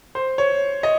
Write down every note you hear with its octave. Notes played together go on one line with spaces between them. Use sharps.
C5
C#5
D#5